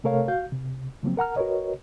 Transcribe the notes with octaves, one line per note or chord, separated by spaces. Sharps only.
C3 A3 A4 A#4 C#5 F5
F#4 F5 G6
C3
C#3 F3 F#3 A#3 C4
A#4 F#5 A#5 F6
F#4 A#4 B4 C#5 D#5